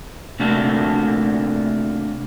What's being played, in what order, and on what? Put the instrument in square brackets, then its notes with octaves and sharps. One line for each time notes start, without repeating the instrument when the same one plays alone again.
[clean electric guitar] C3 A3 A#3 D4 F#4 A4